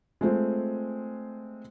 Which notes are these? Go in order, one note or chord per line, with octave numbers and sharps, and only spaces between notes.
G#3 A3 C4 F4